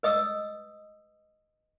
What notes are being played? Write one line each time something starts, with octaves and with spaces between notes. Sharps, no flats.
B4 D#5 D#6 E6